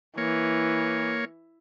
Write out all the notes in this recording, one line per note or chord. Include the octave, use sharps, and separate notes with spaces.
E3 A#3 C#5